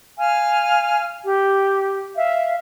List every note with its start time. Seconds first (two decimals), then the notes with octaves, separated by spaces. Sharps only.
0.18 F5 G#5 F6
1.25 G4
2.16 E5 F5